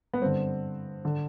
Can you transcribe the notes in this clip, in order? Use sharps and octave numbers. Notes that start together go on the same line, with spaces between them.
B3
G2 D3 C4
D3